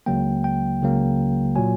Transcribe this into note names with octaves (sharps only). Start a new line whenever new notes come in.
C#2 C#3 F#3 A#3 G5
G5
C#2 C#3 F#3 A#3
A#2 F#3 G#5